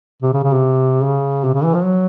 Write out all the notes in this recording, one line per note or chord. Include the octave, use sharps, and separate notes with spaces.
C3
C#3
C#3
C3
C#3
C3
C#3
E3
F3
F#3